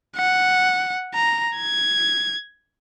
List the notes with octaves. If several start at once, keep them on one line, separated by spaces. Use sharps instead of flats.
F#5
A#5
G#6